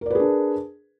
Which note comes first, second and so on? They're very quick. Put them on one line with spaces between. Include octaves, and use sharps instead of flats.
A#4 D5 B4 G#4 D4